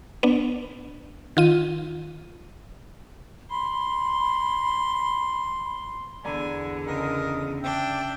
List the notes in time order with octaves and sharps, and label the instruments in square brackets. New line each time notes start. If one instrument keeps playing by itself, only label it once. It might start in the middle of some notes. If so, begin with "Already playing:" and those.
[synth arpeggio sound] B3 D4
D#3 F4 D#7
[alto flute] B5 [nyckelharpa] C6
[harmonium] E2 [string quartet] D3 [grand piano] D5 A#5 B5 [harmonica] G#5
[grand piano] C#3 [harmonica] A#4 D#5
[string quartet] D4 [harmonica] E5 G5